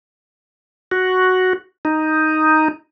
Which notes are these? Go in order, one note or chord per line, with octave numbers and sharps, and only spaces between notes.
F#4
D#4